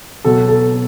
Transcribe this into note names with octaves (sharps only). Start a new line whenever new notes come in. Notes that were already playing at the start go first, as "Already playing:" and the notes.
B2 F#3 A4
A4